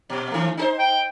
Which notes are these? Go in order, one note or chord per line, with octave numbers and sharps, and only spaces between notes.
A#2
D#3 A3
D#4 G#4 C5
G5